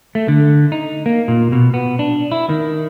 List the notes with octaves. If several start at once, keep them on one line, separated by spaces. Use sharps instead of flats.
A3
D3
D#4
A#3
A#2
B2
B3
D4
E4
D#3